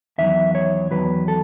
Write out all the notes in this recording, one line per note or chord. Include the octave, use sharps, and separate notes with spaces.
E2 D#3 F#3 E5
C#5
E2 D#3 F#3 B4
A4